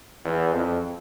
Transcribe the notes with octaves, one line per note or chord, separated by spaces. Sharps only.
E2
F2